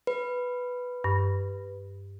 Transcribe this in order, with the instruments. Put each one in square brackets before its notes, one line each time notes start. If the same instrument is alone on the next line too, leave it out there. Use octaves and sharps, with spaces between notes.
[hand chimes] B4
[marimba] G2